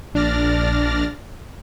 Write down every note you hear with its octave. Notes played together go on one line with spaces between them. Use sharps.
A#1 D4 D5 F6 A6 A#6